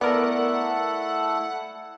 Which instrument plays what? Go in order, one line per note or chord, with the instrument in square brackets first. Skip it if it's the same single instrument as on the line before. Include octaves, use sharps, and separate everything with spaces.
[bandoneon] A3 E4 A4 [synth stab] B3 A#4 [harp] D5 [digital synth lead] F#5